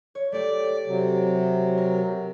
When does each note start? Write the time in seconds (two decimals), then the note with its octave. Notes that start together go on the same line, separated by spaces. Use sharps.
0.15 C#5
0.32 A3 G4 D5 D7
0.87 C3 F#3
1.78 A#4